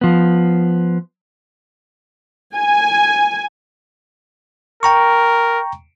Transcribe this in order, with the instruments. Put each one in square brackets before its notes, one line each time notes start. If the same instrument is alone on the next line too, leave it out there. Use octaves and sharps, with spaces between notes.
[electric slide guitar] F3 B3
[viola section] G#5
[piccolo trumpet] A#4 [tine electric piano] G5 A#5 C#6